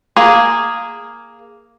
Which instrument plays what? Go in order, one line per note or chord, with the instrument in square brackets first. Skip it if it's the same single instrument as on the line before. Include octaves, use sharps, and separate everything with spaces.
[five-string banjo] A#3 G#4